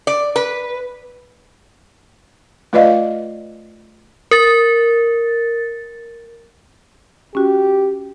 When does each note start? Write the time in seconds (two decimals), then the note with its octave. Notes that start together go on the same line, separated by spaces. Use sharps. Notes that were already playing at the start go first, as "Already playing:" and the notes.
0.07 D5
0.36 B4
2.73 A3 F4 B4 D5 D#5 F5
4.31 A#4 A6
7.35 C#4 F#4 G4